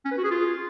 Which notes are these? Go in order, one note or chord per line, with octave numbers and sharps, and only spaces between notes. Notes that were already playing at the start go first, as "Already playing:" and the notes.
C#4
B4
F#4
G#4
F4